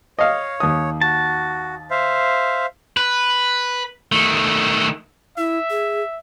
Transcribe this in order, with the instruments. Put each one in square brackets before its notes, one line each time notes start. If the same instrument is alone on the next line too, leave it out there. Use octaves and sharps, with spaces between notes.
[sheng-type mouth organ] C#5 [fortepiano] D#5 F5
[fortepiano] D#2 D#6
[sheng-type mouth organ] F#4 [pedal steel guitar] A5
[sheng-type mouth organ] C5 E5 F5
[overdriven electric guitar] B4
D#3 A3
[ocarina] E4 [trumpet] E5
[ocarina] G#4